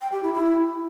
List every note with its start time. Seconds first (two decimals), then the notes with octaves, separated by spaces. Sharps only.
0.01 G5
0.12 G4
0.23 E4
0.34 E4